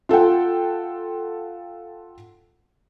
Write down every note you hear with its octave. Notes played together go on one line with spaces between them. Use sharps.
F4 A4 F#5 G5